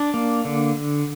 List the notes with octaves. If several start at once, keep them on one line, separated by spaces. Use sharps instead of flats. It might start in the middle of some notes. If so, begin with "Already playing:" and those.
Already playing: D4 D5
A#3
D3